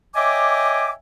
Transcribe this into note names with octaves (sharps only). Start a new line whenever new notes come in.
C#5 D#5 E5 G5 G#5 D6